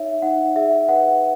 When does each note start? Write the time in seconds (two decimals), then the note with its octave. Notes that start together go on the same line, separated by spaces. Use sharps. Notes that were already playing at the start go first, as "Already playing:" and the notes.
Already playing: D#4 C#5 E5
0.22 D#4 F#5
0.56 G#4 E5
0.89 B4 F#5